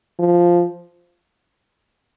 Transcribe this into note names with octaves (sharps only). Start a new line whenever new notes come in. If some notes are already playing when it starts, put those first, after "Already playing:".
F3